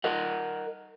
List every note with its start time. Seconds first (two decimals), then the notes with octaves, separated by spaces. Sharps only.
0.04 A#4 D#5 F#5